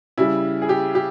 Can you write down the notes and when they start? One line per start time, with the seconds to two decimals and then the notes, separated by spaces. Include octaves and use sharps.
0.18 C#3 G3 E4
0.62 G#4
0.69 G4
0.95 G4